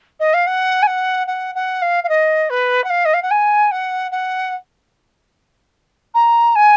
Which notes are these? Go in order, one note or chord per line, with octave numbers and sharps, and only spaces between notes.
D#5
F5
F#5
G#5
F#5
F#5
F#5
F5
F5
D#5
B4
F#5
F5
D#5
F5
F#5
G#5
F#5
F#5
A#5
G#5